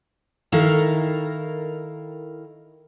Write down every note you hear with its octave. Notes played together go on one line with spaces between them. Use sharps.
D#3 E4 A4 A#4 F5